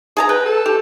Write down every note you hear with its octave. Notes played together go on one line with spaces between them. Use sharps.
G#4 A5 A#5
B4 G5
A4
G4